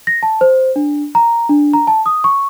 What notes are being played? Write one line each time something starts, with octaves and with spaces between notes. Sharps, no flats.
A#6
A5
C5
D4
A#5
D4
A#5
A5
D#6
C#6